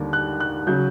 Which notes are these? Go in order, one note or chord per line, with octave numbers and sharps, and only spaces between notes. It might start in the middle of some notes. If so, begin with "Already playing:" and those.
Already playing: D#2 D3 G3 A#3
F#6
F#6
C#3 F#3 G6